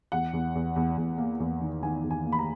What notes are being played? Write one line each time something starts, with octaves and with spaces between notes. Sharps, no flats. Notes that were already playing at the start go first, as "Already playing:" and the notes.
E2 F#5
E2
E2
E2
E2
A#3
E2
D#3
D#3 G#5
E2
G#5
A#3
B5
A#5